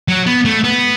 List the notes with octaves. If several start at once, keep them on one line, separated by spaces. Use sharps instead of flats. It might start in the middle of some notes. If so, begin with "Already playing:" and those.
F#3
B3
A3
B3